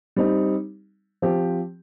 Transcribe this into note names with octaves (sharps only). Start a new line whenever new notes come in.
G3 C4 D#4
F3 C4 G4